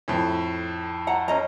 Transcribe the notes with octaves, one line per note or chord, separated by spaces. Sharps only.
F2 A2
F#5 A#5
C#4 D#5 A#5